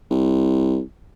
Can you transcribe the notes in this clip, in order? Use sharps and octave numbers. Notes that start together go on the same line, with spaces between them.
C2